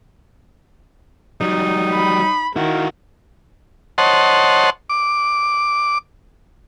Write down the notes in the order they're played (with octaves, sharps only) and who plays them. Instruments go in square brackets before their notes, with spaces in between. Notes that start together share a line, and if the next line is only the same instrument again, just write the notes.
[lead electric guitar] F#3 G3 [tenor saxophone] D#4
[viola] B5
[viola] D#3 [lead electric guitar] E4 F#4
[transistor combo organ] C5 C#5 D#5 F#5 A5 C6
D6